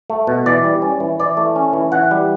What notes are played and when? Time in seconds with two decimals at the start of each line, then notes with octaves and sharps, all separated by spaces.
0.10 A3
0.27 B2
0.46 E3 D5
0.64 G3
0.82 C#4
1.00 E3
1.20 E3 D5
1.37 A3
1.56 C#4
1.73 E3
1.92 E3 F#5
2.11 G3